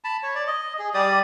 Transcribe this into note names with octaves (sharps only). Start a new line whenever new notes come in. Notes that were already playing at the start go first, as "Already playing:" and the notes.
A5 B5
C#5
D5
D#5
G#4
G3 G4 D5 D#6